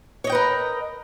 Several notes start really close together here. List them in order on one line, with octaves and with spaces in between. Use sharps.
C#5 D#5 G5 B4 A#4